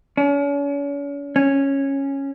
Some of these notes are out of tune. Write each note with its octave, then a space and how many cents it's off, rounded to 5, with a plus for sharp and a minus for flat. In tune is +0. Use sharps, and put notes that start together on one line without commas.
C#4 +40
C#4 -10